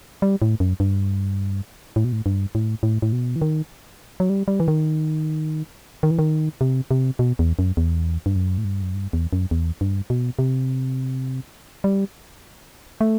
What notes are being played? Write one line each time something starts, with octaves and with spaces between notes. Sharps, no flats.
G3
A2
F#2
G2
A2
B2
A2
G2
A2
A2
A2
B2
E3
D#3
F#3
G3
G3
E3
D#3
D#3
E3
D#3
C3
C3
B2
E2
F#2
E2
G2
F#2
A2
G2
F#2
G2
E2
F#2
E2
G2
B2
C3
G3
A3